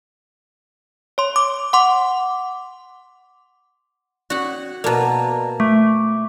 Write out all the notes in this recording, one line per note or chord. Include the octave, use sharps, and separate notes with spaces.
C#5 C6
D6
F#5 C6 D6
C#4 F#4 D5 F#5
B2 A#3 D5 A5 A#5
A3 D6